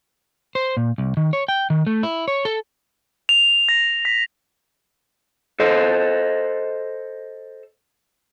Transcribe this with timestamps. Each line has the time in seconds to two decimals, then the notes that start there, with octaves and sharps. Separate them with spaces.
0.55 C5
0.77 A#2
0.98 C2
1.17 D#3
1.33 C#5
1.48 G5
1.70 D#3
1.87 A3
2.03 E4
2.28 C#5
2.45 A4
3.29 F7
3.69 A#6
4.05 B6
5.60 A4 C5 D#5